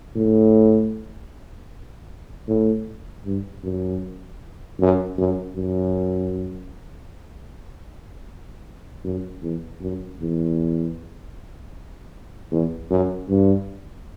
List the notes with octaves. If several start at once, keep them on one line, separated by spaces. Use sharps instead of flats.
A2
A2
G2
F#2
F#2
F#2
F#2
F#2
E2
F#2
E2
E2
F#2
G2